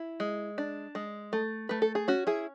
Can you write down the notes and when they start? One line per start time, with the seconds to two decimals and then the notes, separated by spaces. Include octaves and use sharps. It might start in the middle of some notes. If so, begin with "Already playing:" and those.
Already playing: E4
0.20 G#3
0.58 D4
0.95 G#3
1.33 A3
1.69 A3 B4
1.82 A4
1.95 G#4
2.08 C#4 F#4
2.27 E4 G#4